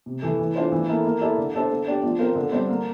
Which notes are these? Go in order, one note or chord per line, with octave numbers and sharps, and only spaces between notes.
C3
E3 A3
E3
A3 D4 F4 C5
E3
A#3 E4 A4
A#3
E4 A4 D5
D3
A3 D4 A4 C5
A3
D4 G4 D5
F3
C4 F4 A#4
D3
G3 C4
A#3